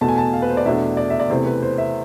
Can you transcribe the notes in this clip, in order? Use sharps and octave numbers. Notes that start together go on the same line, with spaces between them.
E2 B2 A3 A5
G#5
A5
F5
B4
C5
D5
E2 B2 A3 D4 E5
D5
E5
D5
E2 C3 E3 A3 C5
B4
C5
E5